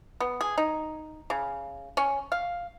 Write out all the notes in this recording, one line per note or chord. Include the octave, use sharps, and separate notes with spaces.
B3
G#4
D#4
C#3
C#4
F5